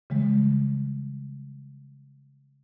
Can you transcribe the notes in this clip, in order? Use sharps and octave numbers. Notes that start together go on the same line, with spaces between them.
C#3 E3 G3 G#3